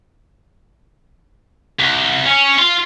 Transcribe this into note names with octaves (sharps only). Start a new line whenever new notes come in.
C2
C#4
F4